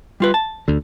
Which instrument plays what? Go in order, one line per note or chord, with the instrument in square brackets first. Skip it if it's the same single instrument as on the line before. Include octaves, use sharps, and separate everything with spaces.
[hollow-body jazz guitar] G3 F4 B4
A5
[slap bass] D2 D3